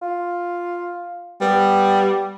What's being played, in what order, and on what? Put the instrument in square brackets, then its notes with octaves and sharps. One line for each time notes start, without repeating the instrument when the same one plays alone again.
[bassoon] F4
[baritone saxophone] G3 [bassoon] B3